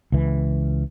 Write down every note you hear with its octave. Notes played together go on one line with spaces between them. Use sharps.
C#2 E3